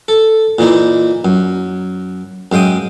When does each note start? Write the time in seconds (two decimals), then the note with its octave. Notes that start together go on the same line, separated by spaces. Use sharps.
0.08 A4
0.58 A#2 E3 A#3 D#4 E4
1.25 F#2
2.52 F#2 G#3 F5 G5 D#6